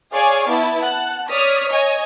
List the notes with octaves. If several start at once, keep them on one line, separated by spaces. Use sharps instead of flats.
G#4 C#5 D5 F5 G#5 C#6
B3 E4 A5
F#5 A5 F#6
C#5 D5 D#6 F6 B6
C#5 D#5 G#5